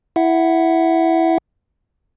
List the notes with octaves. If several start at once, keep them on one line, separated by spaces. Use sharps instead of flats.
E4 E5 F#5